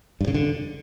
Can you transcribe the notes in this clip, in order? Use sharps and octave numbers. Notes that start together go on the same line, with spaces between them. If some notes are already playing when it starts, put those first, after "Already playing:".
G2
C#3
D3